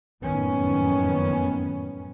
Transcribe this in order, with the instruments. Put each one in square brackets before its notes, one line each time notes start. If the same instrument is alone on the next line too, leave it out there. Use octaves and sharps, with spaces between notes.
[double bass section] F#1 F2 A2 D#3 B3 C#4